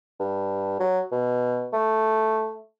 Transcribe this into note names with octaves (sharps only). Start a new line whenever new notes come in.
G2
F#3
B2
A3